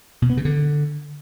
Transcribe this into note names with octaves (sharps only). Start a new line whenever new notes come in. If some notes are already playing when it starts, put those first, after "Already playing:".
B2
B3
C#3
D3